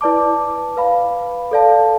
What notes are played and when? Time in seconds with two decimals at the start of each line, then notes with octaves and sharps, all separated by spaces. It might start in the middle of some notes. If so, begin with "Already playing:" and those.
0.01 E4 B4 D5 A5 D6
0.77 B4 F5 B5
1.51 A4 D5 F5 A5